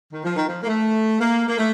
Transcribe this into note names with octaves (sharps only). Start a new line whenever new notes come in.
D#3
F3
D#3
F3
A#3
A3
A#3
A#3
A3